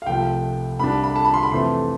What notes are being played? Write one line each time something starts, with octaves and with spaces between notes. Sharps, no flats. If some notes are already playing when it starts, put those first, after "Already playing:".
F5
C2 C3 F3 A3 G5
C2 C3 G3 D4 B5
B5
A5
B5
C6
B5
F2 C3 E3 A3 C4 C6